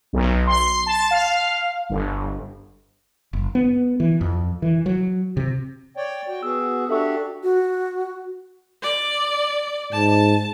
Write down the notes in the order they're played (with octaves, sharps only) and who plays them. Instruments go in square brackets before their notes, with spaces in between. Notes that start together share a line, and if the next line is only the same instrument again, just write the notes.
[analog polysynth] B1
C6
A5
F5
G1
[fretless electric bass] F#1
B3
E3
F2
E3
F#3
C3
[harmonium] C#5 D5 G5
F#4 G5
[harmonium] B3 F#4 G#4 [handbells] E6
[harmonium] D4 F#4 G4 [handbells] A4 E5 C#6
[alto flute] F#4
[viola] D5
[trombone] G#2 [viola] A5